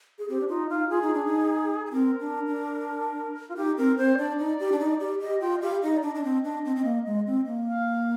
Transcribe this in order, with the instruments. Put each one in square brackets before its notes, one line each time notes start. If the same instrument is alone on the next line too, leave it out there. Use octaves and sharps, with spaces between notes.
[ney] G#4
[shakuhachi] C4 [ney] G4
[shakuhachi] D4
[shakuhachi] D#4 [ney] F4
[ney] D#4 [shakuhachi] F4
[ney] F4 [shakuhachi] G#4
[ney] D#4
D4
D#4
[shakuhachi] G#4
[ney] C4 [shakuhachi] A#4
[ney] D4
D4
[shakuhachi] F4
[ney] D#4 [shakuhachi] G4
[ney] C4 [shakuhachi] A#4
[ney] C4 [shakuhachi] C5
[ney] D4 [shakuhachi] D5
[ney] D#4
G4
D4
D#4
G4
[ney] G4 [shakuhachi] D#5
[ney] F4 [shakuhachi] G5
[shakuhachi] D#5
[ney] G4 [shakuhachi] F5
[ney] D#4 [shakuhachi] D#5
[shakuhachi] D5
[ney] D4
[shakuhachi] D#5
[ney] D4
C4
D4
C4
C4
A#3
G#3
C4
A#3
[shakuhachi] F5